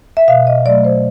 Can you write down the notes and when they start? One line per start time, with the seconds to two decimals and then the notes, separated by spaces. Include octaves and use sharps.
0.17 E5
0.28 B2 F5
0.47 D#5
0.65 F#3 D5
0.69 A3
0.85 C5